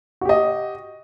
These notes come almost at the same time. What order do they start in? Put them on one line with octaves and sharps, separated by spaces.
F#4 G4 D#5